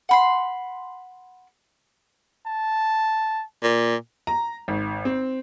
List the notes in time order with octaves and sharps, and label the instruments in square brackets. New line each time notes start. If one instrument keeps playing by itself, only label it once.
[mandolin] F#5 B5 C6
[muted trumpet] A5
[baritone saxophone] A#2
[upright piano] A#5
G#1
C4